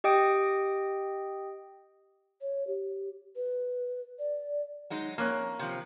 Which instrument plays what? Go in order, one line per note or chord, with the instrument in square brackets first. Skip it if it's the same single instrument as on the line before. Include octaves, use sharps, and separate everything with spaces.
[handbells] G4 D#5 G5 D#6 D7
[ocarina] C#5
G4
B4
D5
[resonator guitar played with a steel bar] F#3 G#3 D#4
[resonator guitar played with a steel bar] F2 [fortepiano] A#3 C#4 F#6
[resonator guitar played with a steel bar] C3 F3